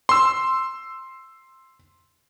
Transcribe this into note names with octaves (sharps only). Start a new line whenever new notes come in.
C6 E6